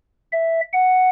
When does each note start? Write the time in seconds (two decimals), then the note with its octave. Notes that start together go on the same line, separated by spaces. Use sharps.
0.32 E5
0.73 F#5